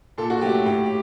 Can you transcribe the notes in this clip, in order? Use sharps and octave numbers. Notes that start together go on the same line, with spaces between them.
A#2 A4
F#4
F#3 A3 G4
A2 G4
G4